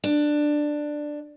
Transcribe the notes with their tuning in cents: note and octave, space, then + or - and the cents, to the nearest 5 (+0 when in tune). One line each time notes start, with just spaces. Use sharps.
D4 +10